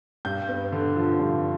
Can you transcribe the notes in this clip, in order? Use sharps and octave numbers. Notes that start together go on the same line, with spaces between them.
G2 G6
B3
D3
F3
G2